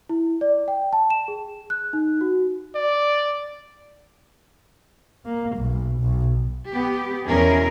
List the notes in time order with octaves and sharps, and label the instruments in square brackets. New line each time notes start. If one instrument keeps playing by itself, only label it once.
[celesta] E4
D5
G5
A5
E7
G#4
F#6
D#4
F#4
[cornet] D5
[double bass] A#3
B1
B1
[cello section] B3 G4
E2 B2 C#4 E4 G#4 A#4